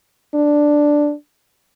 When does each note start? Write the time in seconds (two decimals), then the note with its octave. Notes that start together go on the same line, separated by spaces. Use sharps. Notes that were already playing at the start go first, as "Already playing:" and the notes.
0.34 D4